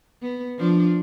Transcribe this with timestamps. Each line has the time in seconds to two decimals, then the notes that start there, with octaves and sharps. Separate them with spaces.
0.22 B3
0.58 F3 D4